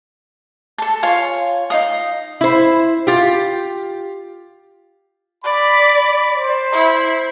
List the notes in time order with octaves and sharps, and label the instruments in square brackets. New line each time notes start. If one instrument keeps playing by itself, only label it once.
[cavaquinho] A4 A5
F4 C#5 F5 G#5
D#4 F5 D#6
[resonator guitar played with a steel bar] E4 C5
F4 G4
[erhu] D5 [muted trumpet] B5
[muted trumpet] C5
[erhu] E4